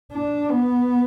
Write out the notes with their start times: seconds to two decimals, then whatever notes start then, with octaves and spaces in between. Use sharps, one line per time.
0.13 D4
0.51 B3